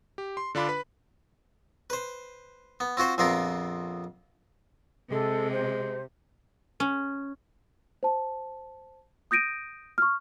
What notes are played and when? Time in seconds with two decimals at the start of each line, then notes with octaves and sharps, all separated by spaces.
0.18 G4
0.37 C6
0.55 D3 D4 F4 B5 D6
0.69 B4 B5 F#6
1.90 B4 C5
2.80 B3
2.97 C4 F4 F#4 C5
3.18 A#1 F2 B3 C4 F4 A#4
5.11 C3 G#3 A4
5.52 C5
6.80 C#4
8.03 C5 A5
9.31 D#6 G6 A#6 D7 D#7
9.98 C#6 F6